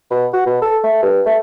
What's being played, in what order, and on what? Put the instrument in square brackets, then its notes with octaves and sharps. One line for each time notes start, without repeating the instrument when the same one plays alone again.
[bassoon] B2
F#4
B2
A4
A3
G2
A3